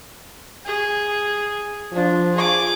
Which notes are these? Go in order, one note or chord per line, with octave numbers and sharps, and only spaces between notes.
G#4
F3 D4
G#4 D6